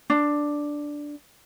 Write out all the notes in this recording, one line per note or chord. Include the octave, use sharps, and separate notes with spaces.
D4